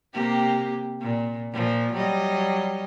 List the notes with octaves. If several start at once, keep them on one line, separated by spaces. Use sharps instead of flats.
C3 A#3 G4
A#2
A#2 F3
F#3 G3 D#5